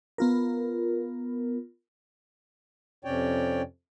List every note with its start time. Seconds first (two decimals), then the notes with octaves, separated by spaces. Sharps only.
0.18 B3 F4 A#4
3.05 F2 C3 C#4 C#5 D5 G5